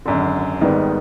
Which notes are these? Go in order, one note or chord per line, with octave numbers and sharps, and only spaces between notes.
G#1 F#2 D3
G#1 G#2 D#3 G3 B3